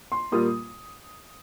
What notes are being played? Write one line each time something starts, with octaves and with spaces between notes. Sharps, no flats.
C6
A#2 G3 A#3 F4 D#6